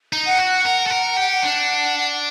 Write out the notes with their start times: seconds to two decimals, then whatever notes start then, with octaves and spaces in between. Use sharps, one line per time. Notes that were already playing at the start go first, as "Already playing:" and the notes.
0.13 D#4
0.26 F#5
0.39 F#4
0.65 A#4 F#5
0.87 A4
0.90 A#4
1.17 G4
1.43 D4